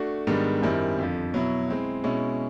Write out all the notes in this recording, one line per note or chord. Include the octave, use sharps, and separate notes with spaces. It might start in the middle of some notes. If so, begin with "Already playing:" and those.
Already playing: A3 D4 F#4
G#2 D#3 G3 B3 D4
F#2 D#3 G3 C4 E4
F2 D3 F3
B2 F#3 B3 E4
G#3 C4 E4
B2 G#3 C#4 E4